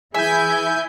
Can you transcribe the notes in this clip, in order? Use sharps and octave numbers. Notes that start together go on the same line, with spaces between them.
E3 E4 G#4 E5 G#5 G6